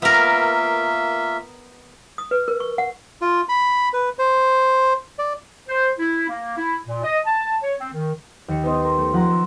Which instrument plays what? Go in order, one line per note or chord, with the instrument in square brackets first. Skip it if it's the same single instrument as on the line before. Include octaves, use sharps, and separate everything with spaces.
[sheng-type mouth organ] A#3 F4 E5 [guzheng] B3 A#4
[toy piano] D#6
B4
A#4
C#6
F#5
[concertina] F4
B5
B4
C5
D5
[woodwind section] C5
E4
A#3
E4
A#2
D#5
A5
C#5
C4
D#3
[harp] D#2 C#7
B3 D#4 C5 D#5
A#4 C6
A3
F3 F#5 A#5 C6
E6